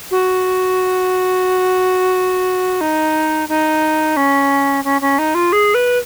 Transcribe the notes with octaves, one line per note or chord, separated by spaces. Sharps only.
F#4
D#4
D#4
C#4
C#4
C#4
D#4
F4
G#4
B4